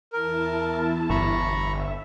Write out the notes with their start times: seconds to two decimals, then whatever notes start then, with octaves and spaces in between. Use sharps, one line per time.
0.13 E2 E4 A#4 A5
1.10 G1 A#5 B5 C#6
1.50 E5